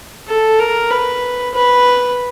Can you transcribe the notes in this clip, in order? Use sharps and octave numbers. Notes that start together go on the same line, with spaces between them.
A4
A#4
B4
B4